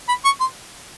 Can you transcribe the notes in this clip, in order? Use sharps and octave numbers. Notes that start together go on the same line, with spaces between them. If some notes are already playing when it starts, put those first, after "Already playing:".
B5
C#6
C6